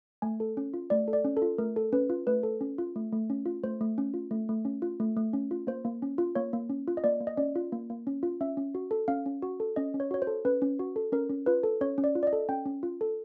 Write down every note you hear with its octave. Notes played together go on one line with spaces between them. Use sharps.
A3 G#5
A4
C#4
F4
A3 D5
A4
D5
C#4
A4
F4
A3 A#4
A4
C#4 B4
F4
A3 B4
A4
C#4
F4
A3
A3
C#4
F4
A3 C5
A3
C#4
F4
A3
A3
C#4
F4
A3
A3
C#4
F4
A#3 C5
A#3
C#4
F4
A#3 C#5
A#3
C#4
F4
D#5
A#3 D5
A#3
D#5
C#4 D5
F4
A#3
A#3
C#4
F4
C#4 E5
C#4
F#4
A4
C#4 F5
C#4
F#4
A4
C#4 D#5
C#4
C#5
F#4 C#5
C5
A4
C#4 B4
C#4
F#4
A4
C#4 A#4
C#4
F4 B4
A4
C#4 C#5
C#4
D5
F4
D5
D#5
A4
C#4 G5
C#4
F4
A4